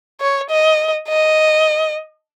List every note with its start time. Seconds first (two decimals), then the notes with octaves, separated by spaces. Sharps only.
0.21 C#5
0.50 D#5
1.09 D#5